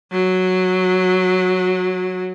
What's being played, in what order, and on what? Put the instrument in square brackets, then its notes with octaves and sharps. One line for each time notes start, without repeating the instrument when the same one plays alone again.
[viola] F#3